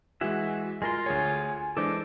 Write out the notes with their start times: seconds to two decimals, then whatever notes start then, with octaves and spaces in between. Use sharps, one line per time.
0.21 E3 G#3 F#4 G#4 E5
0.82 G#3 F4 A#4 G#5 C6
1.06 D2 G#4 C#5 G#5
1.77 E3 G#3 D4 A4 C5 D#5 D6